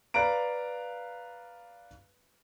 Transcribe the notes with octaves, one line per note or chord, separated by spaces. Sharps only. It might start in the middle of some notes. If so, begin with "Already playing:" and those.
B4 D5 F5 A#5 D7